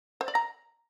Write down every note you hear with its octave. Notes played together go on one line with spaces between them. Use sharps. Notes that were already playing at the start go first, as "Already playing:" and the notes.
C5
D5
A#5